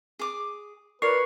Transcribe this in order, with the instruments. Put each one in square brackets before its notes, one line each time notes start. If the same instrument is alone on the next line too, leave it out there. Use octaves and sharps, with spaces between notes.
[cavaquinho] G#4 D6
[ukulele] F4 A#4 D5 [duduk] B4 [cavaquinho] C#5 [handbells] C#6 C7